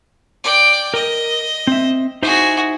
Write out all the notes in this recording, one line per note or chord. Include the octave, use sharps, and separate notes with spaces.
D5 G5
A#4 D#5
C4 E5
D#4 E4 F#4 G#4 C5